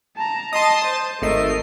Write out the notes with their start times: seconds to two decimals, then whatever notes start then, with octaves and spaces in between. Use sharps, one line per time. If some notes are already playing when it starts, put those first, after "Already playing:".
0.16 A5 A#5
0.53 D#5 A5 C6 D#6
0.85 C5
1.22 G#1 A3 A#4 D#5 C7